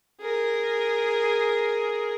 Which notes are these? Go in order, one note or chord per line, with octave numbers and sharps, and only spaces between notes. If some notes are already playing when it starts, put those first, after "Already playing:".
G#4 A#4